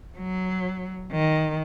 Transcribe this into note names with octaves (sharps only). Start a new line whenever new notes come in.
F#3
D#3